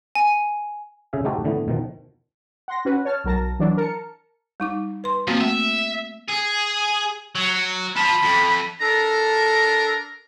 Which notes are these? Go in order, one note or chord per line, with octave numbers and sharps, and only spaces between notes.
G#5
C#3 G#4 E5 F5
A3 D#4 F#4 G4 A4 C5
A2 D3 E3 A3 B3
B2 D#3 F3
F#5 C6 A#6
C#4 F#4 B4
C#5 A5 F6
B1 F#3 A#4 A5 A#6
E3 F#3 D4
A#4 A5 C#7
G3 D#4 D6
B4 C6
F3 A#3 C4 F#4
A3 E5
G#4
F#3
F4 A5 B5
F2
D4 A4 A#4 A#5